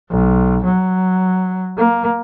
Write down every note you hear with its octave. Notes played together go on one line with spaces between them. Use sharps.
B1
F#3
A#3